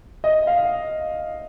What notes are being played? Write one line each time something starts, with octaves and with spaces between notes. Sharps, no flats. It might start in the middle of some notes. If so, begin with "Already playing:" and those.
D#5
F5